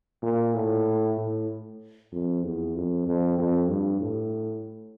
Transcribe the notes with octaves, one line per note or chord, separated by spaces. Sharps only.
A#2
A2
A2
F2
E2
F2
F2
F2
G2
A2